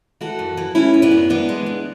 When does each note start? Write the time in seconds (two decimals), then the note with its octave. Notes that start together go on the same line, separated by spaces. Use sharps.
0.21 E3 F#4 A4
0.39 F#2
0.57 E3
0.75 E3 C#4 E4
0.94 F#2
1.02 B3 D4
1.11 F#2
1.30 E3 B3 D4
1.49 G#3
1.66 E3